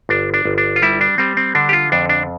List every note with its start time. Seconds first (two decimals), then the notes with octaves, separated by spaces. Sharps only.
0.09 G1 D4
0.34 D4
0.45 G1
0.58 D4
0.76 F4
0.82 G3 E4
1.01 D4
1.18 G3 C4
1.37 C4
1.55 D3 D4
1.69 G4
1.73 F4
1.92 F2 D4
2.09 D4